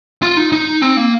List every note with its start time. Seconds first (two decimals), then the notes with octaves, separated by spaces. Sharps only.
0.22 F4
0.37 D#4
0.52 D#4
0.82 C4
0.97 A#3